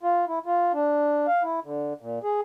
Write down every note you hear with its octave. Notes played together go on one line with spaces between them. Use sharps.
F4
E4
F4
D4
F5
E4
D3
A#2
G#4